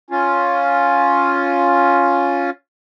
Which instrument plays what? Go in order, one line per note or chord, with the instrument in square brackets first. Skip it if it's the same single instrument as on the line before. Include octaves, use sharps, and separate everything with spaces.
[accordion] C#4 F4